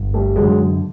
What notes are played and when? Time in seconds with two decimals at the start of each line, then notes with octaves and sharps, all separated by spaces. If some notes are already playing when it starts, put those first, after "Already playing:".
Already playing: G1
0.14 G3 A3
0.36 F#2 D3 F#3 G#3